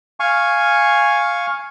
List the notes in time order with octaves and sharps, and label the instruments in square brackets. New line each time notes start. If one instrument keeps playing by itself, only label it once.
[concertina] F5 G#5 C#6